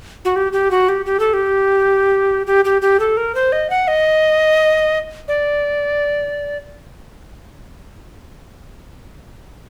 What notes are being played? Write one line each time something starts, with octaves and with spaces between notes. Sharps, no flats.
F#4
G4
G4
F#4
G4
G4
A4
G4
G4
G4
G4
A4
A#4
C5
D#5
F#5
D#5
D5